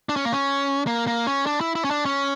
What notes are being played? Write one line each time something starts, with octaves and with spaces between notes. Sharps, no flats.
D4
C#4
A#3
C#4
A#3
A#3
C#4
D4
E4
E4
C#4
D4
C#4